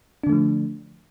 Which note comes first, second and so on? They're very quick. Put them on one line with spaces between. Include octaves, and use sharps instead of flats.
D4 D3 A3 F3